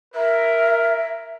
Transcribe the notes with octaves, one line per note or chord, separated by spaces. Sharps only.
A#4 E5